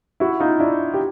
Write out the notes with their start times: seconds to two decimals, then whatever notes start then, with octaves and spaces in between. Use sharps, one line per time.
0.20 E4 F#4
0.40 D#4 F4
0.60 D4 E4
0.94 G4